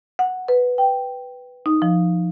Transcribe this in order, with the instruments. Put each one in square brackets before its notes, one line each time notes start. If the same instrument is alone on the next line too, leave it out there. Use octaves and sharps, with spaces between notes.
[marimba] F#5
B4
G5
D#4
F3